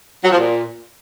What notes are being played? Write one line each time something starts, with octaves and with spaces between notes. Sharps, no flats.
F#3
F3
A#2